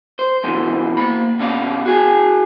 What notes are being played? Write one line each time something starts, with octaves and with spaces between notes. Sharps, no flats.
C5
F#2 B2 D3 E3 F3
A#3 B5
B2 C#4 D5 F5
F#4 G#4 G#5